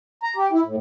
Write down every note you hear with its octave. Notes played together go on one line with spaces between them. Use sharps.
A#5
G4
E4
A2